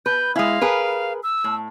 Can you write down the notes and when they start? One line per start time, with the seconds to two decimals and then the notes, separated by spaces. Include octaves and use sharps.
0.06 B4 G6
0.36 G#3 E4 F5
0.61 G#4 A#4 B4
1.23 E6
1.44 A2